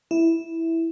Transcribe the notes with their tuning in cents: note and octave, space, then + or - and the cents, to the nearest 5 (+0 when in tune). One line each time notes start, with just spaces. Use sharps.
E4 -5